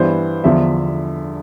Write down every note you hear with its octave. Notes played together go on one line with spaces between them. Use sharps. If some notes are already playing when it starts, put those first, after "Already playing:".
Already playing: G2 E3 B3 C5
E2 D3 F3 E5